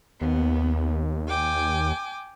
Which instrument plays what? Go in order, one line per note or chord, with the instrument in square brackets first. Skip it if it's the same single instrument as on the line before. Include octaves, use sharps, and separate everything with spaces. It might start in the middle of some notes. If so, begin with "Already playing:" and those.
[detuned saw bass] D#2 [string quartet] B3
[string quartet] G5 G#5 D6